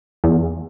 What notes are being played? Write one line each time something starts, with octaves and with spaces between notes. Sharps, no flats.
E2